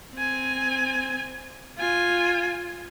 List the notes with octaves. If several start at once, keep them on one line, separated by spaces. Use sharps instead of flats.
C4 G#5
F4 G#5